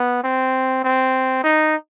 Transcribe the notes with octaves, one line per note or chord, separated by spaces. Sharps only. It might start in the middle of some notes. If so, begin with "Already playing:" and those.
Already playing: B3
C4
C4
D#4